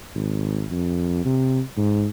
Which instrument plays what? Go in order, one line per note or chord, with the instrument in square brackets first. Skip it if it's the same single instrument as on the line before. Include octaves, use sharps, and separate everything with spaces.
[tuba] G#1
F2
C3
G#2